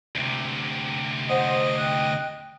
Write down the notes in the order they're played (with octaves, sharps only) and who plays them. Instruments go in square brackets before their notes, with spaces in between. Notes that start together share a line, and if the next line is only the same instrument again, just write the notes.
[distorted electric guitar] D2 C3
[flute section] C5 F#5 [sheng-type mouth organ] D#5
[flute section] G5 F#6